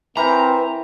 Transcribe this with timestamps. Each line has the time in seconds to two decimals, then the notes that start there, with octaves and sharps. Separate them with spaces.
0.17 E3 C4 A#4 B4 G5 A#5